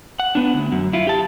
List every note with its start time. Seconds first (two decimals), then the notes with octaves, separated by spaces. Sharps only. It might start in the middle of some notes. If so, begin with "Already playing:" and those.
0.20 F#5
0.35 B3 D4
0.54 D2
0.72 F#2
0.93 E4 F4
1.07 G4 A5